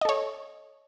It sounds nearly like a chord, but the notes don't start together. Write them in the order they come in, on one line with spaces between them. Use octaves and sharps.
D#5 A4 C#5